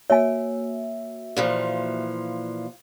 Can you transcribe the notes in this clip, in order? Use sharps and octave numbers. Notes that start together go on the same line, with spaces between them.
A#3 F#4 C#5 E5 G#5
A#2 E3 F3